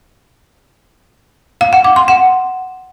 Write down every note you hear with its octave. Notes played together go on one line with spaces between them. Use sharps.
F5
F#5
D6
C6
F#5